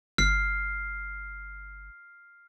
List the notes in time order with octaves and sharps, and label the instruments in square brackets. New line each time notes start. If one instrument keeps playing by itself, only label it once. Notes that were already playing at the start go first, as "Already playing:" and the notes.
[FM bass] G1 [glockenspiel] F6 C7